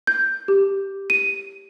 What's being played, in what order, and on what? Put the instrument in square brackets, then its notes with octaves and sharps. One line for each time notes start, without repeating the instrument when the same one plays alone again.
[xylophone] G6
G4
D#7